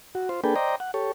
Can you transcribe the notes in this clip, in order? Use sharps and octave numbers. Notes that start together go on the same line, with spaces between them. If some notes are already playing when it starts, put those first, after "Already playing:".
F#4
F4 C5
A#3 D4 G#4 A4 B4 G5
C5 D5 D#5 G5 A#5
F#5
G4 A4 C#5